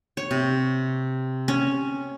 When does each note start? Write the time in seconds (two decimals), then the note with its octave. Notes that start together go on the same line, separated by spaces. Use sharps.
0.17 C#5
0.31 C3
1.48 C#4